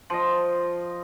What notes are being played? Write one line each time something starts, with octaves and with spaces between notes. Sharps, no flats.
F3 D#5